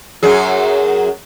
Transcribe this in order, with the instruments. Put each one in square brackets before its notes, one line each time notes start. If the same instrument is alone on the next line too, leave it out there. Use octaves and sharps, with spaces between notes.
[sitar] F#2 F#3 G#4